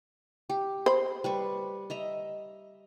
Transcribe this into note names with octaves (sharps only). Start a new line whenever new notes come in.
G4
C5 B5
G3 B4 C#6
D#5 E5 A#5